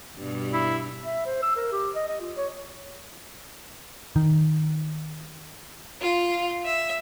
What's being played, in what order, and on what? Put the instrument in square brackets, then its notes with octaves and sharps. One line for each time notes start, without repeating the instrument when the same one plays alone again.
[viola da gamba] G2 B2 G3
[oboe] E4
[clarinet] E5
C5
E6
A#4
G4
D#5
D#5
F4
C#5
[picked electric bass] D#3
[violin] F4
E5